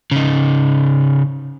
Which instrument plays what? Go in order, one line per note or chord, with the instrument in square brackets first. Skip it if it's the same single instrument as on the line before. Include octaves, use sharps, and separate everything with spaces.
[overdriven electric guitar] C#3 D#4